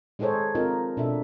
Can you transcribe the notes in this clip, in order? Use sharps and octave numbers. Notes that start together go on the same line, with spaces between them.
G#3 D#4 G#4 A4 C5 C#5
C4 D#4 F4 A#4
B2 D4 A4 E5